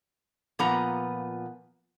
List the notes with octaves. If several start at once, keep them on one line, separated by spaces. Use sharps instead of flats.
A#2 F3 B3 B4 F#5 A#5